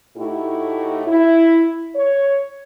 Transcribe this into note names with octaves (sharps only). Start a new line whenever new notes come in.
A2 A3 D#4 E4 F#4 G4
E4
C#5